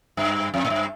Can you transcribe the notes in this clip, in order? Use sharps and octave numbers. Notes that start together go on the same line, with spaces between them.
G2
F2
A2
G2